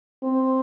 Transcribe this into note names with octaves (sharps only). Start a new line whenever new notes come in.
C4